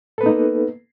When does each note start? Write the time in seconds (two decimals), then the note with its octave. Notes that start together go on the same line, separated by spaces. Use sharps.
0.18 A4
0.21 B4
0.23 B3
0.26 D#4
0.29 A#3